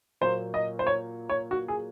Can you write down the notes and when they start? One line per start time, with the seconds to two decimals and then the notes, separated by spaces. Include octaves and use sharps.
0.21 A#2 F#3 A#3 C5
0.54 D#5
0.79 C5
0.87 C#5
1.29 C#5
1.51 F#4
1.68 G#4